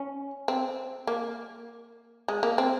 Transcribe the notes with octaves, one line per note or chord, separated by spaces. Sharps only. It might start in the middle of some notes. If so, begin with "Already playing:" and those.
Already playing: C#4
C4
A#3
G#3
A#3
C4